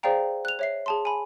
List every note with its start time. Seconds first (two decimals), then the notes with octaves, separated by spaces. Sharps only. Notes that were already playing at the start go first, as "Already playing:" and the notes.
0.03 G#4 C5 D5 F5 G5 A#5
0.45 F#6 F7
0.59 C#5 E5 C7
0.86 G#4 A5 C6
1.05 G#5 B5